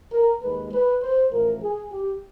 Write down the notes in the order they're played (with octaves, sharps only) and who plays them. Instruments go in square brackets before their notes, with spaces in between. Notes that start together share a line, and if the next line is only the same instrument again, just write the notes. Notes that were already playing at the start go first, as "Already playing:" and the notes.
[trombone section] A#4
D#2 D#3 G#3 B4
B4
C5
A1 A2 F3 A#4
G#4
G4